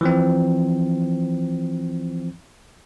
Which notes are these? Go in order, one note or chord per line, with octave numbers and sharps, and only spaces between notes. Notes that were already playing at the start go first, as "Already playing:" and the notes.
E3 F3 C4